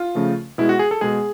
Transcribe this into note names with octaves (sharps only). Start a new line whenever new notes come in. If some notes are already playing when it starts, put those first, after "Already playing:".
Already playing: F4
C#3 F3 A3
B2 G#3 E4
F#4
G#4
A4
B2 G#3 G#4